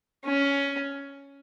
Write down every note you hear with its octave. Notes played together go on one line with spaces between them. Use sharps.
C#4